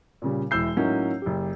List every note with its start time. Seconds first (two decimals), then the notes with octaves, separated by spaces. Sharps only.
0.22 A#2 C#3 G3
0.51 E1 E4 E6 G6 C7
0.77 A2 F#3 A#3 C#4 D#4
1.22 F#1 G4